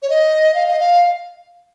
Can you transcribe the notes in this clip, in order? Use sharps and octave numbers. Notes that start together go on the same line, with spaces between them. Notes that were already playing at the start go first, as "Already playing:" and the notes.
C#5
D#5
F5
D#5
F5